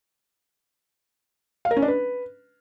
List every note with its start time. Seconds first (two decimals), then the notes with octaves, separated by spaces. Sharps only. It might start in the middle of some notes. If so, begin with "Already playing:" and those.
1.65 F5
1.71 A#4
1.77 C#4
1.82 D4
1.88 B4